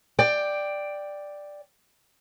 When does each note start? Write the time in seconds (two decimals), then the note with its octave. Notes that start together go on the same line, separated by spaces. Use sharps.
0.19 D5 G5